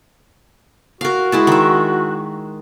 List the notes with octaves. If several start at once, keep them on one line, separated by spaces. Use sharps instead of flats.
F#4 A#4 F5
G#3 E4 A5
D#3 E5